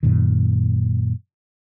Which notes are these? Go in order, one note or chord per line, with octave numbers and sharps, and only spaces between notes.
F#2 A#2 D#3